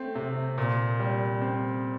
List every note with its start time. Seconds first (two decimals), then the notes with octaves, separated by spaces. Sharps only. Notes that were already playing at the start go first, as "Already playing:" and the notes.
Already playing: A3 C4
0.15 C3
0.58 A#2
1.00 G3
1.42 C4